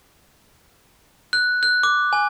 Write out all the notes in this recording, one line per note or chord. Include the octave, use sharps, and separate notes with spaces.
F#6
F#6
D6
G#5